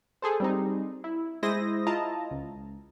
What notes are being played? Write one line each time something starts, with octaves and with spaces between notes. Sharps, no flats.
G#4 A4 C5
G3 C4 D#4
E4
G#3 E4 C5 D#6 A#6
E4 F4 D#5 A5 A#5
C#2